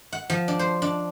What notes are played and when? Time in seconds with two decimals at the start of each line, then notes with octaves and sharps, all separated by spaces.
0.13 F#5
0.30 F3
0.48 D4
0.59 C5
0.82 D4